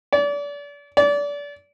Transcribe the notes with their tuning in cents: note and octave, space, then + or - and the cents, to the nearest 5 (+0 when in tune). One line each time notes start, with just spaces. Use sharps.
D5 -35
D5 -30